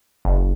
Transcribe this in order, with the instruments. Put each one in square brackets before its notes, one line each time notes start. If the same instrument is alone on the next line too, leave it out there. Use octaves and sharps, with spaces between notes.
[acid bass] F#1